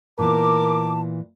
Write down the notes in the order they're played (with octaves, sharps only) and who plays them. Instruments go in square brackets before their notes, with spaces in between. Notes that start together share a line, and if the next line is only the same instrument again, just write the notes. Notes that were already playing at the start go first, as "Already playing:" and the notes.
[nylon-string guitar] A#2 E3 B3 [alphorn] A#4 [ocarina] A5 [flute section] D6